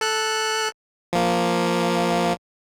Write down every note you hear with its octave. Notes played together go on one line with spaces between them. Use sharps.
A4 F#6
F3 A#3